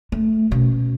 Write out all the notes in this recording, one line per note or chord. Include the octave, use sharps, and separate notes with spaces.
A3
B2 C#4